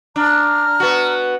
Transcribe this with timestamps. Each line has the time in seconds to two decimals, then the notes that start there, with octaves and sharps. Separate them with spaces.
0.16 D4 A#5 F6
0.80 B3 F#4